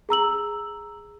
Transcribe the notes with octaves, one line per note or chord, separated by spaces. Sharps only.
G#4 A#5 E6 F#7